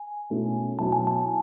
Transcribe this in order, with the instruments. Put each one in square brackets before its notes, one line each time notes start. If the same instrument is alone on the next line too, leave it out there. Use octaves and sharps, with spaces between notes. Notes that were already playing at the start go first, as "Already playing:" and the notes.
Already playing: [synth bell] G#5
[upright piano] B2 A3 C#4 E4
[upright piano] B2 F#3 B3 E4 [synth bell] A5
[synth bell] G#5
A5